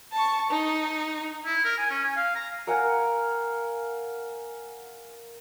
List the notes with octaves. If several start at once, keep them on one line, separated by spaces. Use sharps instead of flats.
A5 C#6
D#4
E4
A#4
G#5
C#4
G#5
F5
A#5
A#4 F5 F#5 G#5